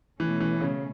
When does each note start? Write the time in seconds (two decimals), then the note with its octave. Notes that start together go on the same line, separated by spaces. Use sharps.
0.19 B2 E3 A3 C#4
0.40 E3
0.61 C#3